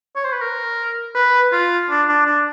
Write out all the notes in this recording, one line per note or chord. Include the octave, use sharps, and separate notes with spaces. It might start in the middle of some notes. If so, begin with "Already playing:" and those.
C#5
C5
B4
A#4
B4
F4
D4
D4
D4